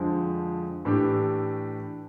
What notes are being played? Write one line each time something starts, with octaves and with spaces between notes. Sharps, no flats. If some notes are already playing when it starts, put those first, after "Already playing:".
Already playing: F2 D3 F3 G#3
A2 E3 A3 D4 G4